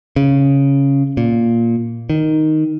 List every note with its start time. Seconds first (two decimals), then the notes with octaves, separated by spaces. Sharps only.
0.16 C#3
1.17 A#2
2.10 D#3